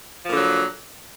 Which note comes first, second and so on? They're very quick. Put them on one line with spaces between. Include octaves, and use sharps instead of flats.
F3 A#2 D3 F#3